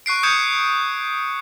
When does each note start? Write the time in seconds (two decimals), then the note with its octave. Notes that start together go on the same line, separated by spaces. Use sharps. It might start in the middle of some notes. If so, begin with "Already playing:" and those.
0.06 C#6 F#6 C7 D7
0.23 D#6 G6 G#6 C#7 E7